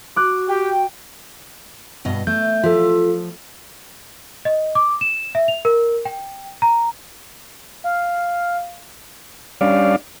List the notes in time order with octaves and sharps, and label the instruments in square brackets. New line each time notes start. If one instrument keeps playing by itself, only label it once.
[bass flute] F#4 [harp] D6 F#6
[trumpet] G4 [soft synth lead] G5
[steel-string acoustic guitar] G2 B2 D#5
[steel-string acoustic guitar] A3 [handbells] G6
[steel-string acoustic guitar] F3 [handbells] F4 A4
[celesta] D#5
D6
E7
E5
F7
A#4
G5
A#5
[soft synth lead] F5
[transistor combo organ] G3 C#4 D4 D5 F5